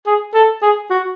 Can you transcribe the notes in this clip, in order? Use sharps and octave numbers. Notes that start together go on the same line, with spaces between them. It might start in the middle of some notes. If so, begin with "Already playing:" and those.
G#4
A4
G#4
F#4